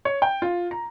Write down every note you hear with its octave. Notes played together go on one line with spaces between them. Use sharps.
C#5
G5
F4
A#5